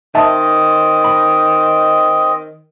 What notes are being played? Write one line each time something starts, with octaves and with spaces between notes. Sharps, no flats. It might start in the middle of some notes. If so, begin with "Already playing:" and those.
D#3 C4 D#5 E5 A5
B5